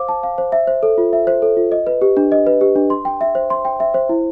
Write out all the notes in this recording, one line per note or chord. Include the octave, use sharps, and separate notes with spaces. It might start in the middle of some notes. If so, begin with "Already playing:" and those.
Already playing: C5 F5 D6
A5
F5
C5
E5
C5
A4
F4
E5
C5
A4
F4
D#5
B4
G4
D4
D#5
B4
G4
D4
C6
G5
E5
C5
C6
G5
E5
C5
E4